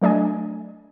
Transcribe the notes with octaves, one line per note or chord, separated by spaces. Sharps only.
F#3 A3 D4 D#5 G#5